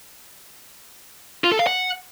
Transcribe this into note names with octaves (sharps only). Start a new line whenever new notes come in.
F4
A4
F5
F#5